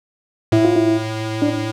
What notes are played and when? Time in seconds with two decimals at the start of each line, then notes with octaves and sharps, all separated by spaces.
0.52 A2 E4
0.65 F4
0.76 E4
1.42 D4